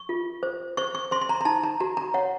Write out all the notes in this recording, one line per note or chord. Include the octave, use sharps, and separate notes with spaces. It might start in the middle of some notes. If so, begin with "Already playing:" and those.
Already playing: C#6
F4
C5
C5 C#6
C#6
C5 C6
C6
A#5
A#5
D#4 A5
A#5
F#4 A#5
A#5
C#5 F#5